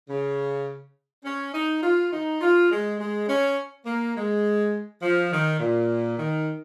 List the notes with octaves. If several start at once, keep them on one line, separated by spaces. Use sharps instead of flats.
C#3
C#4
D#4
F4
D#4
F4
G#3
G#3
C#4
A#3
G#3
F3
D#3
A#2
D#3